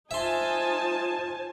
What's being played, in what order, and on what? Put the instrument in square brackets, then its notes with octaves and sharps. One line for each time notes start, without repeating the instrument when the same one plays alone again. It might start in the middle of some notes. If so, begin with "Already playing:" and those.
[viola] D#4 F4 [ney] C5 [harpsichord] E5 C6 [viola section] G#5 A5